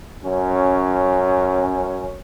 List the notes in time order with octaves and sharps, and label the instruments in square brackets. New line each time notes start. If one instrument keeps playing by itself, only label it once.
[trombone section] F#2 C#4